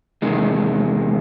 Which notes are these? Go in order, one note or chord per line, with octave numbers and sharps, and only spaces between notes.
E2 C3 D#3 G#3